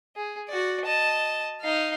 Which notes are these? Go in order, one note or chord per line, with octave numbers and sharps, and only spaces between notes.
G#4
F#4 D5
D#5 A5
D#4 F5